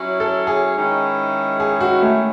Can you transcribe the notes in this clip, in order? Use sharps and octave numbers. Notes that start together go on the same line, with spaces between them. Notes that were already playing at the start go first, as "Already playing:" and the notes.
Already playing: F#3 C#4 E4
A4
G#4
D#3 G#3 C#4 E4
G#4
F#4
A3